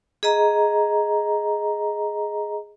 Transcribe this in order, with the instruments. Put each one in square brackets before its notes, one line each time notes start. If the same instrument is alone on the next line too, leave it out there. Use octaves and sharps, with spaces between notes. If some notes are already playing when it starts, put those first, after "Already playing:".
[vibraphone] G#4 D#5 A#5